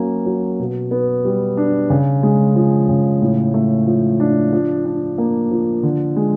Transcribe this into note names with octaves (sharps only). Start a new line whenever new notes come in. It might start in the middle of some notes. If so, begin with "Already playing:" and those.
Already playing: F#3 A#3 C#4
F#3
B2
B3
G3
D4
C#3
G#3
F3
C#3
A2
A3
F3
D4
F3
D4
A#3
F3
D3
G#3